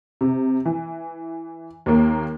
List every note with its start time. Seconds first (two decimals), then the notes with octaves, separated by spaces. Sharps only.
0.21 C3
0.65 E3
1.86 D#2 A#3